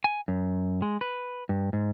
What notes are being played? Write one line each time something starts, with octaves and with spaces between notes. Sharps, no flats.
G#5
F#2
G#3
B4
G2
G#2